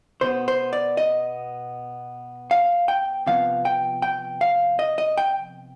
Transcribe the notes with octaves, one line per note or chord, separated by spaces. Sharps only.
B2 B3 C5
C5
D5
D#5
F5
G5
C3 F3 B3 F5
G5
G5
F5
D#5
D#5
G5